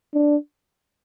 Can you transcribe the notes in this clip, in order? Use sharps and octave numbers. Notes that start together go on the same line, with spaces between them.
D4